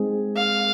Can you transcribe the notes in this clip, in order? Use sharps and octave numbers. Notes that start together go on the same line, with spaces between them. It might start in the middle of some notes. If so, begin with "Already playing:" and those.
Already playing: G#3 C4 D#4 G#4
F5